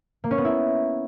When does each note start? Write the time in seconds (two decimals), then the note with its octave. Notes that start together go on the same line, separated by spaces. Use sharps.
0.24 A#3
0.31 C#4
0.38 B3
0.45 E4